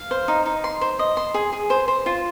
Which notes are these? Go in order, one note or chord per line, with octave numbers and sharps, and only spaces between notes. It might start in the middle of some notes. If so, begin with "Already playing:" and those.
Already playing: F5
C5
D#4
D#4
C6
C5
D#5
C6
G#4
G#4
C5
C5
F4